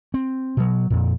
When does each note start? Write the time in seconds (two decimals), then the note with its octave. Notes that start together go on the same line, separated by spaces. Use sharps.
0.14 C4
0.57 B2 F#3
0.90 F2 A#2